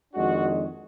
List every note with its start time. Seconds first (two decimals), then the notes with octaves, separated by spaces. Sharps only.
0.13 F2 D#3 G#3 D4 F#4